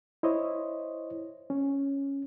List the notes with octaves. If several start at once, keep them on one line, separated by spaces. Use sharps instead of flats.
E4 C5 C#5 D#5
C#4